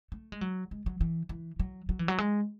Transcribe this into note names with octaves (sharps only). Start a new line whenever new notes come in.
A3
G#3
F#3
G#3
F#3
E3
E3
F#3
F#3
E3
F#3
G#3